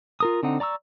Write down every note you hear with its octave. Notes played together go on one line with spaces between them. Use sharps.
F4 A#4 D#6
D3 C4 D#4 F#5
D5 A#5 C#6 E6